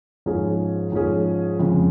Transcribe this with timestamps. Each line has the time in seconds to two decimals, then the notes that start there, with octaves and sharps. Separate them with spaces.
0.26 G#2 F3 C#4 G#4
0.92 G#2 F3 C#4 G#4
1.59 F2 C#3 G#3